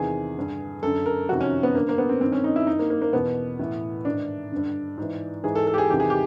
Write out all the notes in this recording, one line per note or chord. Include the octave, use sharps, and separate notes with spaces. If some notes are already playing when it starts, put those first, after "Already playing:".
Already playing: E2 C3 D#3 G#4
G2 D3
F#2 D3 A4
A#4
F2 C3 D#3 F#4
C#4
B3
G2 D3 A#3
A#3
B3
C4
G2 D#3 C4
C#4
D#4
E4
G2 D#3 D#4
A#3
A#3
A#3
E2 B2 B3
A2 E3
G#2 D#3 D4
G2 D3
G#2 E3
G#2 E3 G#4
A4
A4
G4
G#4
E2 C3 D#3 G4
G#4
G4